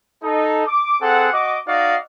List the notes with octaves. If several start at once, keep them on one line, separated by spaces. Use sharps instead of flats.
D#4 A4
D6
C4 G#4 A4 F#5
F#4 D#5 D6
D#4 F#4 D5 D#5 F5